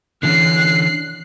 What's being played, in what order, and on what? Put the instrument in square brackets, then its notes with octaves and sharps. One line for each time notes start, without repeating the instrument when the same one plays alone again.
[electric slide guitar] D3 E3 C#4 [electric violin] F#6 C7